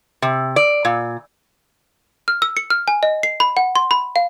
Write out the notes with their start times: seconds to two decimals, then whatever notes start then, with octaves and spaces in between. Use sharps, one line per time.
0.22 C3
0.56 D5
0.85 A#2
2.28 F6
2.42 E6
2.57 C#7
2.70 F6
2.88 G#5
3.03 D#5
3.23 C7
3.40 B5
3.57 F#5
3.76 C6
3.91 B5
4.16 F5